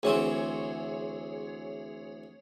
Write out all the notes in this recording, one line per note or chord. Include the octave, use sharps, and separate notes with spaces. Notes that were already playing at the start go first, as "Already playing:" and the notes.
D2 E3 C4 G#4 C#5